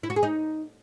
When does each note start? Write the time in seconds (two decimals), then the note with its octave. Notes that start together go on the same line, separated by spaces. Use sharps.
0.03 E4
0.10 F#4
0.16 G#4
0.23 D#4